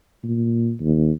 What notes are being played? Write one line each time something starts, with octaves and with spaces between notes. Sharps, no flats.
A#2
D#2